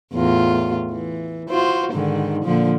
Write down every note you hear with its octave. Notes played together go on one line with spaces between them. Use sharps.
E2 A2 F4
E3
F4 F#4 C5
G#2 D3 D#3
A#2 D3 F3